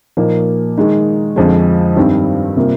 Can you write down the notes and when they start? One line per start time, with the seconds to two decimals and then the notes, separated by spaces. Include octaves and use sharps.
0.17 A#2 F3 A#3 D#4
0.77 D#3 G#3 D#4
1.36 F2 D3 F3 G#3
1.96 G2 D#3 G3 C4
2.56 C3 G3 A#3 F4